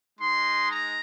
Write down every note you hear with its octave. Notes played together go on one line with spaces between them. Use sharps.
G#3 D#4 C6
A#5